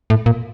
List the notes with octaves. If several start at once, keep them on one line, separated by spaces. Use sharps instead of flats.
A2
A#2